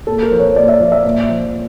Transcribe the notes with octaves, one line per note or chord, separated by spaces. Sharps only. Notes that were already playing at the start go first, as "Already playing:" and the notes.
A#2 A4
A#4
F3
C#5
A#2 D5
E5
F3
E5
A#2
F3